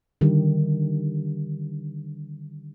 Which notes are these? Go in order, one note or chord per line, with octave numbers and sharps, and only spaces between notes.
D3 D#3 G3 G4